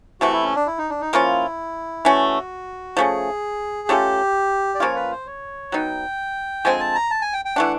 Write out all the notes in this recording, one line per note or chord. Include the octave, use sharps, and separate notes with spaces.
C3 E3 A3 F#4
E4
C#4
D4
E4
D#4
D4
D#4
F3 A#3 C#4 E4 F4
E3 A3 C#4 F#4
F3 A3 C#4 G#4
A3 C#4 F4 G4 A4
D5
F3 A#3 C#4 F4 C#5
B4
C5
C#5
F#3 B3 D#4 G5
D3 F3 G#3 C4 G#5
A5
A#5
A5
G#5
G5
G5
E3 A3 D4 F#5